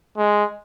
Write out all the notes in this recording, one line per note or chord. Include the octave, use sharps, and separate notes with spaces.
G#3